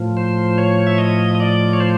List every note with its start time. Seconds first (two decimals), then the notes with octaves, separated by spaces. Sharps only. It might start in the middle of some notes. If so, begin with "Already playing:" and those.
Already playing: A2 F3
0.17 C5
0.58 C#5
0.87 E5
0.98 D#5
1.35 D#5
1.40 D5
1.73 C#5
1.80 C5